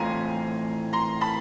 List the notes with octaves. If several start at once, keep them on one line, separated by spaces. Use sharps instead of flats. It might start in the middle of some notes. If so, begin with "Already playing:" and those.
Already playing: A2 E3 A3 C4 F4 G#5 A#5
A#5 C6
A5 B5